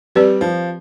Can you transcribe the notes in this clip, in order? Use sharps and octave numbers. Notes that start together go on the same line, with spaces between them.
G3 C4 G4 B4 D5
F3